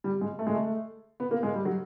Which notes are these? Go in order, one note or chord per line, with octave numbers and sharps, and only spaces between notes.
G3
G#3
A3
G#3
A3
B3
A#3
G#3
G3
F#3